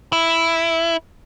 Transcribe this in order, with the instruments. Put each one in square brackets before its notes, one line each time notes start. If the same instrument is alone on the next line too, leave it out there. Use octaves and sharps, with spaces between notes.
[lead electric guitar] E4